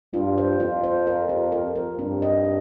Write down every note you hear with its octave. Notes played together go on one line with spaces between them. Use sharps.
G2 F4
C5
F2 F4
C5
A#4
G4
A#4
A#4
G2 C4
D#5
G4